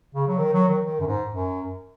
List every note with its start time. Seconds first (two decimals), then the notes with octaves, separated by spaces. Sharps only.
0.15 C#3
0.27 F#3
0.38 D#3
0.53 F#3
0.68 D#3
0.84 D#3
1.00 F#2
1.07 G#2
1.29 F#2